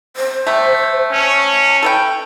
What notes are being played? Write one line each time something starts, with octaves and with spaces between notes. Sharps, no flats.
C5
G3 A3
C#4 A5
A4 B4 G5